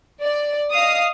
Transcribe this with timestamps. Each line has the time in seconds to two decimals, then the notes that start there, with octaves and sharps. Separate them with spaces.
0.22 D5
0.72 D#5 F5 D#6